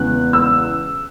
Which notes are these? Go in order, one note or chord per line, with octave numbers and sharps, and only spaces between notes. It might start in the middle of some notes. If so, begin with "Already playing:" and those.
Already playing: E2 C#3 G#3 B3 F#6
E6